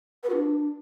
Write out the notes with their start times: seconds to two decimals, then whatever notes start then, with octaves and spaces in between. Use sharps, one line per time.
0.23 B4
0.29 F#4
0.36 D4